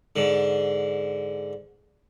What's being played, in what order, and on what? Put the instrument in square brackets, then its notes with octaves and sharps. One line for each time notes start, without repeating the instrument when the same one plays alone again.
[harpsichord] G#2 D3